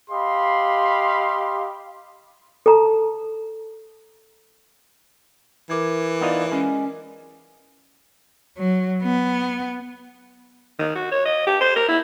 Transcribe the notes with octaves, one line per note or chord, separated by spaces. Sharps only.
G4 D#5 F5 B5 C6
A4 A5 A#5
E3 A#4 D6 G#6
B3 D#4 F4 D5
G#3 C#4
F#3
B3
D#3
F#4
C#5
D#5
G4
C5
A#4
E4